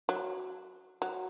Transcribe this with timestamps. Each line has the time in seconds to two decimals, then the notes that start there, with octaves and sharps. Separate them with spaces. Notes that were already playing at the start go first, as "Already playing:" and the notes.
0.09 F#3
1.02 F#3